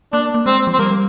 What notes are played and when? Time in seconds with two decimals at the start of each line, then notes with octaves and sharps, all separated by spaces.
0.13 A#3 D4
0.35 A#3
0.46 G#3 C4
0.67 F3
0.74 C4
0.79 G3 A#3